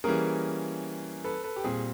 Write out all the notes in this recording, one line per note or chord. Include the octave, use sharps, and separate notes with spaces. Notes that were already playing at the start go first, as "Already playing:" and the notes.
E3 G3 A#3 C#4 G#4 A#4
A4 B4
A4 B4
G4
A#2 G3 C4 G#4